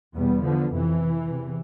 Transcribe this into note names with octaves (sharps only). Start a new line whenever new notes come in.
E2 B2 G3 B3
D3 F3
F2 C3 E3
E2 C3